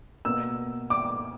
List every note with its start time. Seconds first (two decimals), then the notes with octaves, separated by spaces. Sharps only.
0.25 B2 A#3 E6
0.90 D6